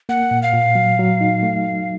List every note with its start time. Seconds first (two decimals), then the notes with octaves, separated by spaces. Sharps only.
0.09 A#3 F#5
0.31 A#2
0.42 F5
0.54 A#2
0.75 F#3
0.99 F#3
1.21 D#4
1.43 A3